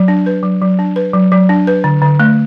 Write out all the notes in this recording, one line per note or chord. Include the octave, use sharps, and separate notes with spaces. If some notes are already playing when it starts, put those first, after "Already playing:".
Already playing: F#3
D4
B4
F#3
F#3
D4
B4
F#3
F#3
D4
B4
D3
D3
A3